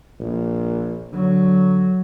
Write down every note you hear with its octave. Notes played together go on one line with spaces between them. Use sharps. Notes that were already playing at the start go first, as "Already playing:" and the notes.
A#1
D3 F#3